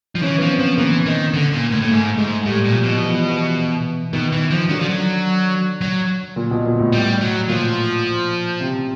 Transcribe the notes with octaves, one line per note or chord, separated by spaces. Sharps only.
F3
E3 C#4
F3 B3
C4
F3
E3 A#3
D#3
D3
A#2
A2
A2
G#2 A3
G#2 G#3
A2 G3
A#2
F3
B2
F3
E3
E3
B2 D#3
E3
F3
D3 F#3
F3
F#3
F#3
A#2
B2
A#2
A2
G3
F#3
A#2 F3
C3